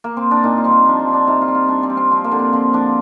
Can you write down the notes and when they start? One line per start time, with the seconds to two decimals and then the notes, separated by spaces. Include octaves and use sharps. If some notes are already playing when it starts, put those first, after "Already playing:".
0.04 A#3
0.17 C4
0.31 D4
0.44 A#2 D#4
0.58 F4
0.64 G3 C4
0.71 A#3
0.86 F3 D4
0.99 C4
1.07 F3
1.14 D4
1.27 C3 D#4
1.42 F4
1.48 G3
1.55 F4
1.69 G3 D4
1.83 C4
1.90 G3
1.97 C4
2.11 F3 C4
2.24 A#3
2.31 D3
2.39 C4
2.53 F3 C4
2.73 F3 D4